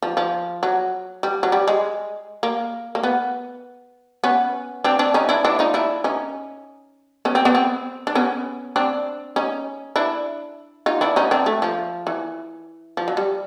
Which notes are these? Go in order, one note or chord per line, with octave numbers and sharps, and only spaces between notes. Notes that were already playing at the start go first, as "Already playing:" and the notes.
F3
F3
F#3
G3
F#3
G3
G#3
A#3
A#3
B3
B3 C#4
C4 D4
C4 D4
C#4 D#4
D4 E4
D4 E4
D#4 F4
D4 E4
C#4 D#4
B3 C#4
C4
B3
C4
D4
B3 C#4
C4 D4
C#4 D#4
D4 E4
D#4 F4
D4 E4
C#4 D#4
C4 D4
A3
F3
E3
F3
F#3
G3